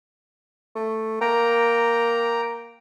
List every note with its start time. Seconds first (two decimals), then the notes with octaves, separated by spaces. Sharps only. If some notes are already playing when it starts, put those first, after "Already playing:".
0.75 A3
1.21 A#3 G5 A#5